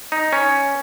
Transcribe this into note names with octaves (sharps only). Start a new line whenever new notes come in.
D#4
C#4